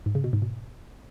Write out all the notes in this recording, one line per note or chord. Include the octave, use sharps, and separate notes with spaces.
G#2
C#3
B2
G#2
B2